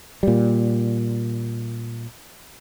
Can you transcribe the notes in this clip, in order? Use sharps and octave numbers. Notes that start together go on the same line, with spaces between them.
A#2 G3